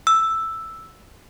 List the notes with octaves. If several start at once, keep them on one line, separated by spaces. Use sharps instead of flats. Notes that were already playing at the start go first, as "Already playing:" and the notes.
E6